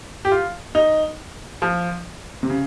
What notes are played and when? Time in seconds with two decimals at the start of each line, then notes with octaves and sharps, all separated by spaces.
0.25 G4
0.31 F4
0.75 D#4
1.62 F3
2.43 C3
2.50 C#3